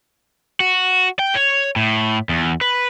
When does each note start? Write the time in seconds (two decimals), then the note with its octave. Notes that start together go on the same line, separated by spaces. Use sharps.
0.60 F#4
1.19 G5
1.35 C#5
1.76 A2
2.29 E2
2.61 B4